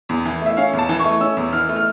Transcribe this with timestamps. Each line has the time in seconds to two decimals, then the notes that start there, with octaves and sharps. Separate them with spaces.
0.09 E2
0.25 E3
0.41 A3 E5
0.57 C#4 F5
0.73 E2
0.79 A5
0.89 E3
0.99 C#6
1.05 A3
1.21 C#4 E6
1.37 E2
1.53 E3 F6
1.69 A3
1.76 F6